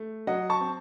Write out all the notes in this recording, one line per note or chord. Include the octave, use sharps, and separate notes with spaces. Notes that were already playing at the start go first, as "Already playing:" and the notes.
Already playing: A3
F#3 D#5 F#5
A5 C#6
C4